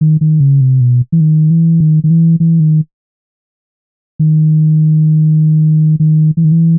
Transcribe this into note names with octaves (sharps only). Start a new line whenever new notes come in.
D#3
D#3
C#3
C3
B2
E3
D#3
E3
D#3
D#3
E3
E3
D#3
D#3
D#3
E3
D#3
E3